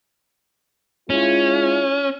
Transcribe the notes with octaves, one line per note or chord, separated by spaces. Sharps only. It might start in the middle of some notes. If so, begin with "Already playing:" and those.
G#3 C#4 E4 F4